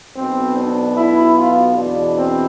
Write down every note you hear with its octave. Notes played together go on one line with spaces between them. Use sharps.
B1 B2 B3 C4
D4
E4
F4
E2 B2 B3 D4
C4